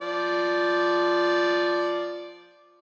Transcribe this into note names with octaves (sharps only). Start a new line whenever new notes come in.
F3 D5